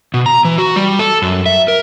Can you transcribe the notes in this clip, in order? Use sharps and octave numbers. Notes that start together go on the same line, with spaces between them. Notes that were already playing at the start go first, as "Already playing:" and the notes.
B2
A#5
E3
F#4
G3
A4
F#2
E5
A#4